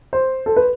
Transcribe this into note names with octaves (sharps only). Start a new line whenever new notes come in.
C5
A4
B4